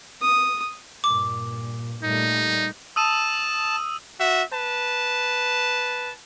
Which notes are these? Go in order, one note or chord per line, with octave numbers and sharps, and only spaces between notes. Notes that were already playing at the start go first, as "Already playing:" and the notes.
D#6
G2 A#2 D6
A#2 G3 A3 D#4
A5 D#6 E6 D#7
F#4 E5
B4 A5